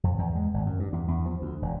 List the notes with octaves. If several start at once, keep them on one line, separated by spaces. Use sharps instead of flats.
F2
E2
G#3
G#1
F#2
G2
E2
E2
F3
D2
E1